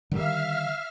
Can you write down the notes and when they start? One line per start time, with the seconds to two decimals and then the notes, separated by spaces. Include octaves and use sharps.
0.11 D3 D#3 G3 E5 F5 F6